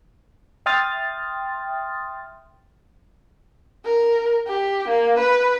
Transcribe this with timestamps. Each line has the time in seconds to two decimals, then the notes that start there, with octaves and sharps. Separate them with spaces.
0.66 E5 G5 C6 D#6 F6 A6
3.85 A#4
4.48 G4
4.89 A#3
5.19 B4